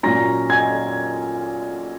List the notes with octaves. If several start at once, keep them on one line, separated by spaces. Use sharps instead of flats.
A#2 F#3 C#4 A#5 A#6
G#5 G#6